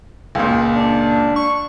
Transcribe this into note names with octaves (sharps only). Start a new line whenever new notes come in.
C#2 A#2
D4
C#6